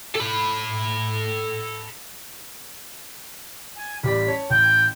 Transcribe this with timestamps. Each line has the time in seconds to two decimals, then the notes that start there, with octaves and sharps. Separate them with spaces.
0.15 A4 B5
3.76 G#5
4.03 A1 G3 D5 B6
4.27 C#4 C#5 A5
4.50 A1 G5